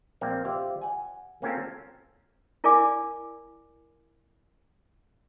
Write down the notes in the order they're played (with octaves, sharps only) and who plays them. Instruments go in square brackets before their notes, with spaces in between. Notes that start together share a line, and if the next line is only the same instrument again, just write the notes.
[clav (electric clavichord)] A#1 A#3 C4 D5
F4 G4 C5 D5 E5
F#5 G#5
A#3 C4 C#4 F4 A4 A#4
[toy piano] E4 A#4 D5 G#5 D6